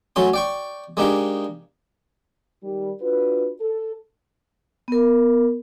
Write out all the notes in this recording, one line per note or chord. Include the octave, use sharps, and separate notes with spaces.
F#3 A3 C#4 C6
D5 G5 C#6
G#3 A#3 D4 D#4 G4
D#3 G3
D4 F4 F#4 B4
A4
B3 A#4